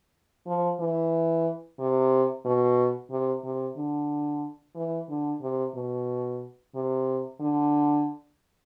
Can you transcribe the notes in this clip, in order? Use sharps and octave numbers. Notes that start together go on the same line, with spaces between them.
F3
E3
C3
B2
C3
C3
D3
E3
D3
C3
B2
C3
D3